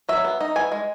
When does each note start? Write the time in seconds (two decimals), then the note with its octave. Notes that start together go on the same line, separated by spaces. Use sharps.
0.09 F#3 E5
0.24 B3
0.41 D#4
0.56 E3 G#5
0.72 G#3